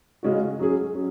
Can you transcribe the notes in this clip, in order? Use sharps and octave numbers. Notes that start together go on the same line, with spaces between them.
C#3 G#3 C#4 F#4
F#3 C#4 G#4
F#3 C#4